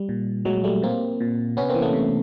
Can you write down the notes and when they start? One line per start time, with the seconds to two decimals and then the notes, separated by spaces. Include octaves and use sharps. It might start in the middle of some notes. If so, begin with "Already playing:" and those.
Already playing: G3
0.09 A#2
0.45 A#2 F#3 G#3
0.64 G3 A3
0.82 A#2 A#3 C4
1.21 A#2
1.57 C3 B3 C#4
1.69 A#3 C4
1.75 E3
1.82 A3 B3
1.93 C3